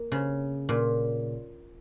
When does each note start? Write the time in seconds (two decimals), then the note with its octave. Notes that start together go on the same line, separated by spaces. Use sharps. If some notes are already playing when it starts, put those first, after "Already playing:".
Already playing: A#3
0.12 C#3
0.69 A#2